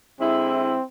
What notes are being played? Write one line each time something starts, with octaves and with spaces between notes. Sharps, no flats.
D3 G#3 C4 E4